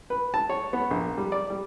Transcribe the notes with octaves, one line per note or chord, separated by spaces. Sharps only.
B4
A5
C#5
B3
A#1
G3
D5
G3